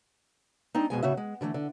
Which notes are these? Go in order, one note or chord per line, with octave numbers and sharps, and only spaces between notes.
G#3 C4 D4 D#4
F2 B2 G#3 G#5
A2 C#3 F#4 E5
G#3
D3 E3 F#3 A3
D3